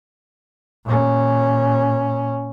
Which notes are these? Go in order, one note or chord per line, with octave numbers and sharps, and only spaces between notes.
A#2 C#4